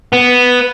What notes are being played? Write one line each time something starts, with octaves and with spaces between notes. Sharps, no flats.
B3